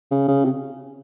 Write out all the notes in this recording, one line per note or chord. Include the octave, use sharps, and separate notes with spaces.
C#3
C#3
C3